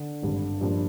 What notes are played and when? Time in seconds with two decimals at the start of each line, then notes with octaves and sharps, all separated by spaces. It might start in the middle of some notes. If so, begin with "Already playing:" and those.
Already playing: D3 D4
0.23 G#1 G2 D3
0.61 G2 F3 A#3 D4